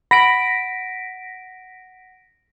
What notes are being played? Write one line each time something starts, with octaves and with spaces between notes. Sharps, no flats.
F#5 B5 A#6 B6 D7